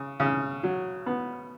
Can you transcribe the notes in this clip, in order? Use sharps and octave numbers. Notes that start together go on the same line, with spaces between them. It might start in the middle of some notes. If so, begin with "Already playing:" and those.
Already playing: C#3
C#3
F#3
B3